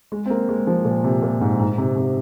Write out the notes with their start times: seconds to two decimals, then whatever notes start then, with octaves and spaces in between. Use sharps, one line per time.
0.12 G#3
0.26 C4
0.30 A#3
0.49 G#3
0.67 F3
0.85 A#2
1.04 C3
1.23 A#2
1.41 G#2
1.59 G#2
1.78 C3
1.96 C3